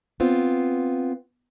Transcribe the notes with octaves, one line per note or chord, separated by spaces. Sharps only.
B3 C4 F4